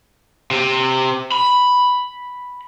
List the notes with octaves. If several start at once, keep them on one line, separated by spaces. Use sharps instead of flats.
C3
B5